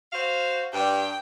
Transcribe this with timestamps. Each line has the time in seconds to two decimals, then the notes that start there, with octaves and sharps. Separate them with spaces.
0.13 F#4 C5 F5
0.73 G2 G5